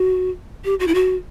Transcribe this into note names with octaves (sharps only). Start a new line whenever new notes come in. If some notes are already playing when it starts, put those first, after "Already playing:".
Already playing: F#4
G4
F#4
E4
F#4